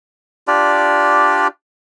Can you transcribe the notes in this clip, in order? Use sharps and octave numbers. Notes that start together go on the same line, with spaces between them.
D4 F4 G4 D5